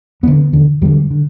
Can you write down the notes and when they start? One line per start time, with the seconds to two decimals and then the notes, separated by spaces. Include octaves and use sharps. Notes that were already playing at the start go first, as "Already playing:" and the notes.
0.23 E2 D3 B3
0.52 E2 D3
0.82 E2 D3 G3
1.11 D3